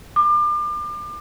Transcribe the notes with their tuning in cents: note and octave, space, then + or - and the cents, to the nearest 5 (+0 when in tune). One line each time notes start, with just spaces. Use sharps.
D6 +35